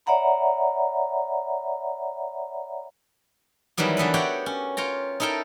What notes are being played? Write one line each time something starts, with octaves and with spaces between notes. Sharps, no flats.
C#5 D5 E5 F#5 A#5 B5
D#3 E3 F#3 G3 B3
D3 E3 B3 A4 B4
F#4 G4 C#5 D5 F#5 G5
C#4
F4 C#5 G5 A#5
D#4 E4 A4 A#4 G5